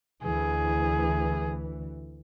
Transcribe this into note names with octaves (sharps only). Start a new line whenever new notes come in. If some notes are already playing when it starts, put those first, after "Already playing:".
D2 E3 G#4